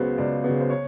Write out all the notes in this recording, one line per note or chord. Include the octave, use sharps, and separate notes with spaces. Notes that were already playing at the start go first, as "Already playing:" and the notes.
Already playing: C#2 C#3 F#3 B3 C5
C#2 D5
C#3 F#3 B3
C5
C#5